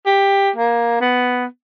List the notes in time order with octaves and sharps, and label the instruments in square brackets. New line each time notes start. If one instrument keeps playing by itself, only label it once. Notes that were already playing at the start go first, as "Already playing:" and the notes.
[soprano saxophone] G4
A#3
B3